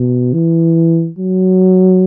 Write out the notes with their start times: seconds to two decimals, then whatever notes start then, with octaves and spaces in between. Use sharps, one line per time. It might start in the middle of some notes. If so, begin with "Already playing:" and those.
Already playing: B2
0.33 E3
1.18 F#3